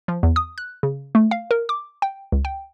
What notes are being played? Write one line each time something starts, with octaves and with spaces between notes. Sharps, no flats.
F3
E2
D#6
F#6
C#3
A3
F5
A#4
D6
G5
C#2
G5